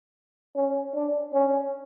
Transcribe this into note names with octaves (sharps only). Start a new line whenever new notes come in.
C#4
D4
C#4